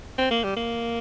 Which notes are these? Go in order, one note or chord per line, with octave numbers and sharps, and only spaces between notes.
C4
A#3
G3
A#3